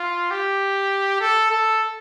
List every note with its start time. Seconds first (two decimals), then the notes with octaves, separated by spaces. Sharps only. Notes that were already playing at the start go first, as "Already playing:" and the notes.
Already playing: F4
0.31 G4
1.21 A4
1.51 A4